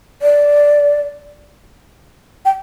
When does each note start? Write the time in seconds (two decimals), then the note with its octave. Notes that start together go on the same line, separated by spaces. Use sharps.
0.22 D5
2.45 G5